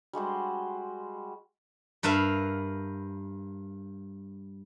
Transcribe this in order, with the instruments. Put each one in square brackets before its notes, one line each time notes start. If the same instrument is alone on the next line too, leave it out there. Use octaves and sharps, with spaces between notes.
[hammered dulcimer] G3 G#3 F#4 C5
[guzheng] G2 A#4 B4 E5 F5